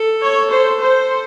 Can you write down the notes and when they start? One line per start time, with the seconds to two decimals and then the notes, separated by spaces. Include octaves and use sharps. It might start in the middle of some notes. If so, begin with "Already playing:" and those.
Already playing: A4
0.22 C#5
0.51 C5
0.80 C5